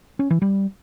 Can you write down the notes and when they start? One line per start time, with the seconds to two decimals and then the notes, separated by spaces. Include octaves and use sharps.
0.19 C#4
0.30 E3
0.42 G3